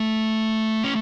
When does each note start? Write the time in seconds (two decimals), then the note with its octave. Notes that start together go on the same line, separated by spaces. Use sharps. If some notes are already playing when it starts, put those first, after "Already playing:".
Already playing: A3
0.84 C#4